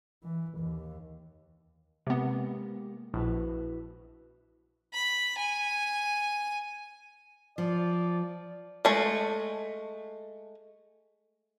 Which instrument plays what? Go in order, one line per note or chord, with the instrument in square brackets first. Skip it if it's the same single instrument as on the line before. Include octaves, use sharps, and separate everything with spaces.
[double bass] E3
D#2
[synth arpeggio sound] C3 B3 [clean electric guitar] G#3 A#3 G4
[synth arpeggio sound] A#1 [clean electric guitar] E4 F#4 B4
[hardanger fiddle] B5
G#5
[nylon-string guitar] F3 [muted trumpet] D5
[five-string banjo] G#3 A3